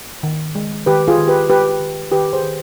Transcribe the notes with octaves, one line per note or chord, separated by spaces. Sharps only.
D#3
G#3
D#3 G4 B4
F4 G#4
D#3
G4 B4
G#3 G4 B4
D#3
D#3 G4 B4
G#4 C5
D#3